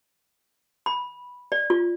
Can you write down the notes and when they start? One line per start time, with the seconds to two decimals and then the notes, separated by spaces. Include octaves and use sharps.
0.86 B5
1.52 D5
1.70 F4